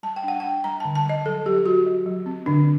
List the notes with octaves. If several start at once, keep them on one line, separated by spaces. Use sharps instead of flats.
G3 A5
G5
D4 F#5
D4 G5
G3 A#5
D3 A5
A5
G3 D#5
F#3 A4
F#3 G4
F#3 F#4
F#3
F#3
C4
D3 D4